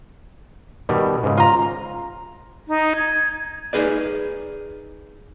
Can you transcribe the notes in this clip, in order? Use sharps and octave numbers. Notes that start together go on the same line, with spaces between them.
B2 D#3 G3
G#2 C#3
F4 A#5
D#4
G#6
D#4 G#4 B4 D5